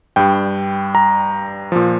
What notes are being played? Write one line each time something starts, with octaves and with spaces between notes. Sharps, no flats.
G2 G3 G5
A#5
A#2 F3